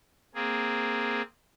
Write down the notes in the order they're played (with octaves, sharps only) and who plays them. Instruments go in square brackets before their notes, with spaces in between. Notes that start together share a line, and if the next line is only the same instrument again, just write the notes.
[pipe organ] A#3 C4 G#4